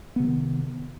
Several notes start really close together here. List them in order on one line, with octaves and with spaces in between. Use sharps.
B3 C3 F3 D#3